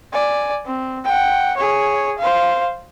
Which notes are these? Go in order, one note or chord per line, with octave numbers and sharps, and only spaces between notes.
D5 G#5
C4
F#5 G5
G#4 C#5
C5 F5